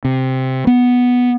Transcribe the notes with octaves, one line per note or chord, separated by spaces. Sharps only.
C3
B3